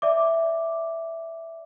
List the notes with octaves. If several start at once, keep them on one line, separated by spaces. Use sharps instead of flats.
D5 E5 D6